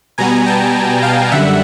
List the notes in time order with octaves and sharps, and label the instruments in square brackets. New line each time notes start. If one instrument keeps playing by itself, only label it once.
[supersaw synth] B2 G3 B3 G#5 A#5
G5 A5
F5 G5
F#2 D3 G3 E5 F#5